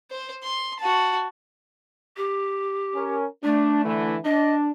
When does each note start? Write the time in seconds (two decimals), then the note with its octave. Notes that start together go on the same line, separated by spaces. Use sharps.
0.11 C5
0.44 C6
0.80 F#4 A5
2.17 G4
2.95 C#4 A#4
3.44 A3 D4
3.84 D3 E3
4.25 D4 D#5